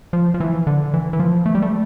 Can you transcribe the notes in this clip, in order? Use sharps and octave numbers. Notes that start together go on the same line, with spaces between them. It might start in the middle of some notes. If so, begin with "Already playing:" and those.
F3
F3
E3
D3
E3
E3
F3
A3
G3
A3